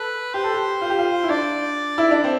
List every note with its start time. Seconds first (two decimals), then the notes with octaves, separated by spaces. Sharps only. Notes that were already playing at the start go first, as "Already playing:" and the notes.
Already playing: A4 B4
0.34 G4 C5
0.44 A4
0.54 G4
0.81 F4
0.90 G4
0.99 F4
1.23 E4
1.29 D4 D5
1.98 E4
2.11 D4
2.24 C4